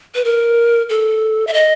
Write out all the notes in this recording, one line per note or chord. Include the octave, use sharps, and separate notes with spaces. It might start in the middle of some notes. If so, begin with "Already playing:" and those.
B4
A#4
A4
E5
D#5